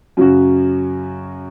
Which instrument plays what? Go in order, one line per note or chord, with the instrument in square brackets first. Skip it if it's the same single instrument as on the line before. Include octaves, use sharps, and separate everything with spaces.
[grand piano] F#2 C#3 F#3 C#4 F#4